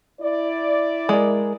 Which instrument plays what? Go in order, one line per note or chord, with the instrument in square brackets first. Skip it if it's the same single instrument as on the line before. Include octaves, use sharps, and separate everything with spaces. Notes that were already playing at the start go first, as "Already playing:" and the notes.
[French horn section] E4 D5
[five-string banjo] G#3 A#4